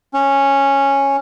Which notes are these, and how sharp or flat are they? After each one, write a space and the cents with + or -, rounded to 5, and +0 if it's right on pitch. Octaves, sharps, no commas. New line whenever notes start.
C#4 -5